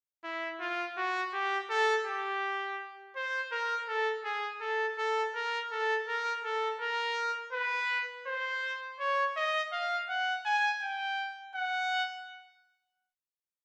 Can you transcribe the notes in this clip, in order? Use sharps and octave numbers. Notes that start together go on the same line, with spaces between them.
E4
F4
F#4
G4
A4
G4
C5
A#4
A4
G#4
A4
A4
A#4
A4
A#4
A4
A#4
B4
C5
C#5
D#5
F5
F#5
G#5
G5
F#5